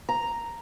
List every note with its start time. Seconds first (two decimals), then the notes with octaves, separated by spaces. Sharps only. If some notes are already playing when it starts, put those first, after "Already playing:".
0.09 A#5